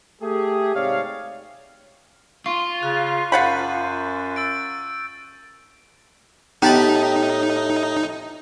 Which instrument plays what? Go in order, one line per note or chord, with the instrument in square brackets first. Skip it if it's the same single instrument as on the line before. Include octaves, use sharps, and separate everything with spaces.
[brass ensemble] A3 G4 G#4
G#2 C3 C#5 D5 F5
[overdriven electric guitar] F4 [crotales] C#6
[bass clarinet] C#3 [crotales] F#6
[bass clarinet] F#2 [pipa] F5 F#5 B5 [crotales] G6 A6 D#7
[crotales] E6 A6 D7
[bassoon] A2 [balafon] B3 [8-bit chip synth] D#4 [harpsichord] G4 A5 B5